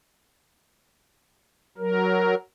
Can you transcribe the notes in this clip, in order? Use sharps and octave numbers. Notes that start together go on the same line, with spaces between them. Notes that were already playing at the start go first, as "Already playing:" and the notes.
F#3 A#4